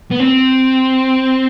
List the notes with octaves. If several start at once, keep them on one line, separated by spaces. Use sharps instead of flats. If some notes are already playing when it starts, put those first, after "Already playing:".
B3
C4